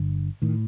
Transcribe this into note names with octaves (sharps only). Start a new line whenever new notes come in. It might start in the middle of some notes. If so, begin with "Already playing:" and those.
Already playing: G1 G2 D3
A2 D#3